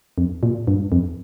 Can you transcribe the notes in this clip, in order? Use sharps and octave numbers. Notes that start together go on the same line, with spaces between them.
F2
A#2
G2
F2